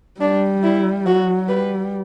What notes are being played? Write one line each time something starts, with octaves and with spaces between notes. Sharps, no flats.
G3 D4
E4
F#3 F#4
G3 B4